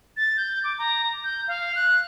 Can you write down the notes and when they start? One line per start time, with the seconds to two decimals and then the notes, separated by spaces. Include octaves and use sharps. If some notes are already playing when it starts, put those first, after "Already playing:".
0.17 A6
0.37 G6
0.64 D6
0.79 A#5
1.24 G6
1.48 F5
1.75 F#6